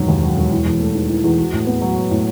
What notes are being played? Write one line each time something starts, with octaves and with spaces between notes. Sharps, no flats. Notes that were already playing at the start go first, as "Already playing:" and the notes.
Already playing: E1 F#2 D#3 F#3
D#2
F#3
E1
E4
E2
A3
D#3
E4
E2
F#4
A2
B3
F#3
F#4
A2